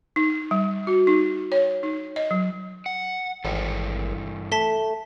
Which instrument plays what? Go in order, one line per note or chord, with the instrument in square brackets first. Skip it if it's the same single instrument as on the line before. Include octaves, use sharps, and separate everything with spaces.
[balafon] D#4
G3
F#4
D#4
C#5
D#4
D#5
F#3
[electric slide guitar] F#5
[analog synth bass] G#1 [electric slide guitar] G2 E3 A4
[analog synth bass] A3 [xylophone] A5 B6 G7